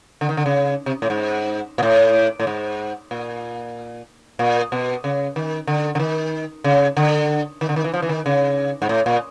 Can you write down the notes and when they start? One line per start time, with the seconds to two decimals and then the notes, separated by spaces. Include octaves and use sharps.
0.21 D3
0.29 D#3
0.37 D3
0.46 C#3
0.86 C3
1.02 A2
1.10 G#2
1.78 A#2
1.83 A2
2.40 A2
2.47 G#2
3.11 A#2
4.39 A#2
4.72 B2
5.04 C#3
5.36 D#3
5.67 D3
5.95 D3
5.99 D#3
6.64 C#3
6.97 D3
7.61 D#3
7.69 D3
7.76 D#3
7.84 E3
7.94 F3
8.02 E3
8.09 D#3
8.26 C#3
8.82 G#2
8.89 A2
9.06 A#2